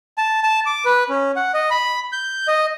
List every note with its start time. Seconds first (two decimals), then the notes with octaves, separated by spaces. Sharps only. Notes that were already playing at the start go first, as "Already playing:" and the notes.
0.18 A5
0.43 A5
0.66 D6
0.85 B4
1.09 C#4
1.36 F#5
1.54 D#5
1.71 B5
2.12 G6
2.48 D#5